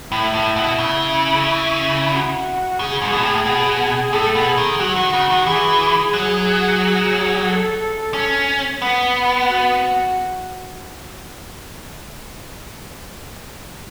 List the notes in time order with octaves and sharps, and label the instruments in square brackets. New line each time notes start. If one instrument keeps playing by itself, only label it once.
[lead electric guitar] A2 [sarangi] E4
[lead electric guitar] A2
B2
C#3
[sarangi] F#4
[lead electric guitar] C#3 [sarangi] G#4
[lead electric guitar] G#2
B2
A2
B2
[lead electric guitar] A2 [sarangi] A4
[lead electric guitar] B2
[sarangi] G#4
[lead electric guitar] D#3
[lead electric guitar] F#3 [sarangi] F#4
[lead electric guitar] D#3
C#3
D#3
[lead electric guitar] E3 [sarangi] G#4
[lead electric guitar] F#3
[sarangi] A4
[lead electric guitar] C#4
B3
[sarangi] F#4